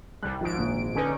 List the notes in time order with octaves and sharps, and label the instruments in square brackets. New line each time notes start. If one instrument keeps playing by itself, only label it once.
[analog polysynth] C2 G3 [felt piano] F#6
[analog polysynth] G#1 G#2 D7 [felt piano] F3
[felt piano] A#1
[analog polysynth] D3 C#4 D#4 [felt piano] B4 G#5